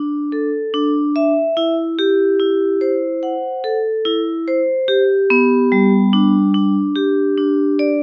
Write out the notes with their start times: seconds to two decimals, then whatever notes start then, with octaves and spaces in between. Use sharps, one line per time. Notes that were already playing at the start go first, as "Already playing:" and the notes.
Already playing: D4
0.32 A4
0.74 D4
1.16 E5
1.57 E4
1.99 G4
2.39 E4
2.81 C5
3.23 F#5
3.64 A4
4.05 E4
4.48 C5
4.88 G4
5.30 B3
5.72 G3
6.13 D4
6.54 D4
6.96 G4
7.38 D4
7.79 D5